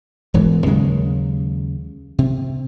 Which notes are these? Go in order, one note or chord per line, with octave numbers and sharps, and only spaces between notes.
E1 G#2 E3
D#2 C#3 F#3 G#3
C3